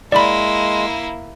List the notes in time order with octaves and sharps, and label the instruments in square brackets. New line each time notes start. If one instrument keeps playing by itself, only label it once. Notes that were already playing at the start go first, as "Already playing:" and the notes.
[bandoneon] G#3 [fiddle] A#3 E4 [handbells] D5 B5